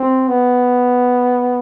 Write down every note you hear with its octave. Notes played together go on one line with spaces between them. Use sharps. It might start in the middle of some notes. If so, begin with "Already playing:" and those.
Already playing: C4
B3